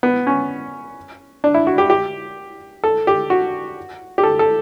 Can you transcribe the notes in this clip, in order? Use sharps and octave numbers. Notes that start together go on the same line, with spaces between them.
B3
C#4
D4
E4
F#4
G4
G4
A4
G4
F#4
G4
A4
A4